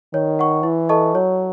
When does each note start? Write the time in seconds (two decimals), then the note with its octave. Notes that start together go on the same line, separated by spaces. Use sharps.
0.13 D#3 C#5
0.39 F#5 C#6
0.63 E3 E4
0.89 A4 D#5 A5 C#6
1.15 F#3 C#5